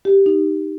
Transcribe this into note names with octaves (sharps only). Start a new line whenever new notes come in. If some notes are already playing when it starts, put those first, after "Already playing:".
G4
D#4